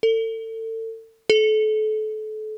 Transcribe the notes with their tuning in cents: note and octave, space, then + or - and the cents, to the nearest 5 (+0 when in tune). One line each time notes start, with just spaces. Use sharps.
A4 +35
A4 -30